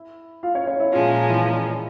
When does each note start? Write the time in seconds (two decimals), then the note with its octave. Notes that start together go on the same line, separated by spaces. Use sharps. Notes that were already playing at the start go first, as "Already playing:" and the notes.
Already playing: E4
0.43 F4 F5
0.55 C#4 C#5
0.67 C#4 C#5
0.80 E4 E5
0.92 A#2 F3 G#3 C#4 F4 F5
1.29 E3 E4